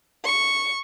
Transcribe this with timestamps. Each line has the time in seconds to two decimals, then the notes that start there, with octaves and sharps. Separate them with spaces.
0.25 C#6